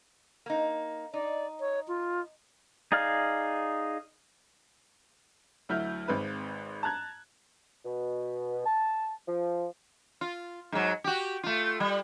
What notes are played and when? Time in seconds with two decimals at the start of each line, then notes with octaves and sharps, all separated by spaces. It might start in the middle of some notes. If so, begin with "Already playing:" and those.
0.46 A#3 D#4
1.13 D#4 D5
1.60 C#5
1.88 F4
2.92 D#4 G#4 D5 F5 F6
5.69 D2 F#3 E4 E5 F6 G6
6.08 G#1 G#2 C4 B4 B5
6.83 A5 A#5 F#6 G#6
7.85 B2
8.65 A5
9.28 F3
10.21 F4
10.72 G#2 F#3
11.04 F#4 G4
11.43 A3 F4
11.80 G3